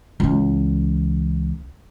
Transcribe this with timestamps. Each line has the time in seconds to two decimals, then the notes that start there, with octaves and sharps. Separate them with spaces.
0.20 C#2 E3